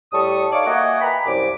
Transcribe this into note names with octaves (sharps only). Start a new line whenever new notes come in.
A2 G3 A4 C#6 D#6
D#4 C#5 D5 F5 C#6 D6
A#3 F#4 D#5 E5 F#5 G#5
B4 G5 G#5 A#5 B5
C2 F#2 D6